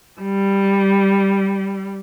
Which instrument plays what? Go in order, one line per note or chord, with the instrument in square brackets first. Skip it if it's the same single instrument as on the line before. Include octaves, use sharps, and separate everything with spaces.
[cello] G3